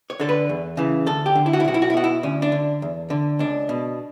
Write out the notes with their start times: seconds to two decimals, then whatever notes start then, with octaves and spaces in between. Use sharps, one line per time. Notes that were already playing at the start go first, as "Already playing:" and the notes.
0.10 C#5
0.20 D3 A4
0.29 B4
0.49 E2
0.77 C#3 E3
1.06 D2 A4
1.26 G4
1.35 D3
1.46 E4
1.53 F#4
1.60 E4
1.65 B1 F#4
1.74 E4
1.82 F#4
1.90 E4
1.94 B2 F#4
2.04 E4
2.23 D2 C#4
2.42 D4
2.52 D3
2.82 E2
3.10 D3
3.39 C#2 D4
3.69 B2